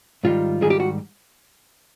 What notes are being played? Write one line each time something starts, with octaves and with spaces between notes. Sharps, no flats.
G#2 D#3 G3 F4
G#2 D#3 G3 G#4
G4
F#4